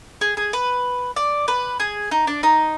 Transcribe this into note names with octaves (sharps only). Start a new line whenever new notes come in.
G#4
G#4
B4
D5
B4
G#4
D#4
D4
D#4